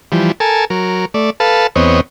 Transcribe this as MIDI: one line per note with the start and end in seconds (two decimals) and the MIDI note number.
0.12 0.32 52
0.12 0.32 53
0.12 0.32 55
0.40 0.65 69
0.40 0.65 70
0.40 0.65 80
0.40 0.65 81
0.70 1.05 54
0.70 1.05 70
1.14 1.30 57
1.14 1.30 74
1.40 1.67 69
1.40 1.67 71
1.40 1.67 77
1.40 1.67 81
1.76 2.01 40
1.76 2.01 59
1.76 2.01 60
1.76 2.01 73
1.76 2.01 75